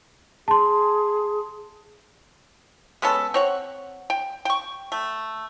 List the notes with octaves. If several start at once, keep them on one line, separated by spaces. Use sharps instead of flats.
G#4 A5 C6
G#3 B3 C#4 A4
C4 C#5 F#5
G5
G5 C#6
A3